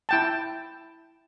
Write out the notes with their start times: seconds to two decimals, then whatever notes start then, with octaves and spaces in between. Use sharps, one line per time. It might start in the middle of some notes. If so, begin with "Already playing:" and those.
0.09 E4 G5 A5